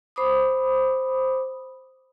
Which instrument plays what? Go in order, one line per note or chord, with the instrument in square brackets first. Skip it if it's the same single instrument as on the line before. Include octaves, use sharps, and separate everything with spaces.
[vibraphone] C5 B5 D6 D#6